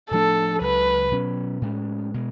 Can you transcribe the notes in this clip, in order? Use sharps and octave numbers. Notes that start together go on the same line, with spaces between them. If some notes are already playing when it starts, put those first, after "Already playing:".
A2 F3 A3 D4 A4
C#2 C#3 F#3 B4
B2 F#3 C#4
A2 G#3 C#4
B2 G#3